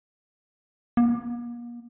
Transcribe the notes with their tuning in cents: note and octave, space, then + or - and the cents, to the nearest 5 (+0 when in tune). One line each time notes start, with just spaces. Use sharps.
A#3 +40